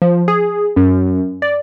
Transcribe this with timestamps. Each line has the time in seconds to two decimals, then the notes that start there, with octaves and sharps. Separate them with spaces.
0.02 F3
0.28 G#4
0.76 F#2
1.42 D5